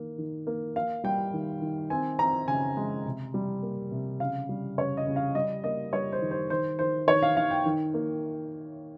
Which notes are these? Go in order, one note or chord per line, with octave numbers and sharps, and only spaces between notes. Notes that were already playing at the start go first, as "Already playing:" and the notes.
Already playing: D#3 A#3
D#3
A#3
A#3 F5
G3 G5
D#3
D#3
C4 G#5
C4 A#5
C#3 G#5
G#3
C3
G3
A#3
C3
C#3 F5
G3
C#3 C#5
D#5
C#3
F5
G3 D#5
A#3 D#5
G3 C#5
C5
D#3
C5
D#3 C5
D#3 C5
D#3 C#5
F5
D#3 F5
G5
D#3
A#3